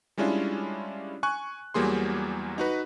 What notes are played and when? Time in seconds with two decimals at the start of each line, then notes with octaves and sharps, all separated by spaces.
0.18 G3 G#3 C#4 D4 E4 F4
1.23 G#5 C#6 F#6
1.74 E2 F#3 G3 A#3 G#4 C6
2.58 D#4 F#4 B4